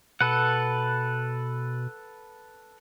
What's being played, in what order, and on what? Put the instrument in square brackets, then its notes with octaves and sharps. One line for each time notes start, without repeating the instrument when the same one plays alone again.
[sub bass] B2 [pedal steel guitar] A4 B4 F#5